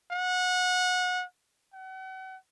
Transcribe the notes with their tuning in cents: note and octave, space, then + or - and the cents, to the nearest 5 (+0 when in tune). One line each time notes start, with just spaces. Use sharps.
F#5 -25
F#5 +40